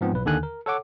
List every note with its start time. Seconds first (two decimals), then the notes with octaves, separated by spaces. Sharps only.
0.01 G#2 F3 B3 C4
0.13 B1 B4
0.25 D#2 D3 D#3 A4 G#5 F#6
0.43 A#4
0.66 A4 C#5 F#5 D6